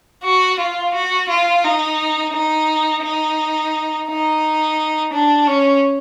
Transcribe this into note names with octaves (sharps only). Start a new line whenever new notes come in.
F#4
F4
F#4
F4
D#4
D#4
D#4
D#4
D4
C#4